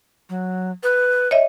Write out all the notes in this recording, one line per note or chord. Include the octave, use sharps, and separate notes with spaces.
F#3
B4
C#5 D#5 E5